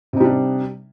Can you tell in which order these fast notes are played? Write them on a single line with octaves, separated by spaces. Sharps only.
C3 D#4 G3 D4